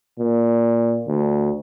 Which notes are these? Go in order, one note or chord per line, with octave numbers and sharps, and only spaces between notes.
A#2
D2